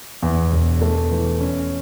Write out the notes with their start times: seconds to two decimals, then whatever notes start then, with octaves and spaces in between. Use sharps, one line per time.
0.22 E2
0.52 E1
0.82 A3
1.11 E3
1.41 C#4